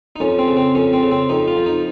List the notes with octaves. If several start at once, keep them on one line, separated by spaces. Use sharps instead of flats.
D#4
F2 C#4
C4
C#3
C4
F2 C#4
C4
C#3
C4
F2 D#4
F4
F3
D#4